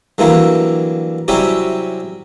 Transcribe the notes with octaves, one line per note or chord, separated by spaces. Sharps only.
D3 E3 F#3 G3 A#3 E4
C3 F#3 G3 C#4 E4 G4